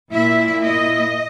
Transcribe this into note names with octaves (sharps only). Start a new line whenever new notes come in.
A#2 A#3 E4 E5
D#5